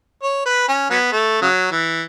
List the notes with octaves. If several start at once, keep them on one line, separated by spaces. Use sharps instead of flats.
C#5
B4
C#4
F#3 B3
A3
C#3 F#3
E3